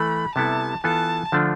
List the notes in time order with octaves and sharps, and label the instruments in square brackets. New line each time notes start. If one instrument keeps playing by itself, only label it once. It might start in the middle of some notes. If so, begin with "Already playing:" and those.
Already playing: [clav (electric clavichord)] E3 A3 [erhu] B5
[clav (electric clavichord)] C3 G3 B3 E4 A4 [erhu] A5
[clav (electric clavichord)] E3 B3 F4 A4 [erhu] A5
[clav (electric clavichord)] D3 F3 A3 D4 F4